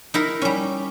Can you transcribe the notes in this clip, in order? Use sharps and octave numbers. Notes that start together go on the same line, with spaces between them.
D#4 E4 A#4
G3 C#4